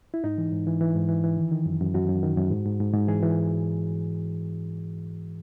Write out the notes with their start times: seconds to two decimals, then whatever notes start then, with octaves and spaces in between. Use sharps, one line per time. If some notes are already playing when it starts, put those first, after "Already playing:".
0.14 E4
0.24 G#2 D#4
0.38 E3
0.52 G#2
0.67 E3
0.81 E3
0.95 G#2
1.09 E3
1.24 E3
1.37 D#3
1.51 D#3
1.66 F#2
1.81 F#2
1.94 F#2 F#4
2.09 F#2
2.23 D#3
2.37 F#2
2.51 G#2
2.66 G#2
2.80 G#2
2.94 G#2
3.08 E3 G#4
3.23 E3